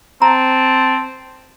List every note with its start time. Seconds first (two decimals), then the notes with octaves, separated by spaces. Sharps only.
0.22 C4 A5 A#5